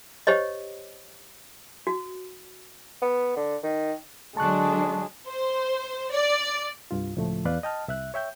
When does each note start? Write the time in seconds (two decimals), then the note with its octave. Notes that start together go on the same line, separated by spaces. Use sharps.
0.27 G4 C5 C#5 D#5
1.87 F#4
3.02 B3
3.37 D3
3.63 D#3
4.37 D3 F#3 G#3 D4 A5 C#6 F#6
5.28 C5
6.12 D5
6.91 C2 G2 F4
7.17 C#2 A2 F3 A3
7.45 E2 B4 D5 F5 F#6
7.63 D#5 G5 A5 F6
7.88 C2 E5 F#6
8.14 C#5 E5 G5 G6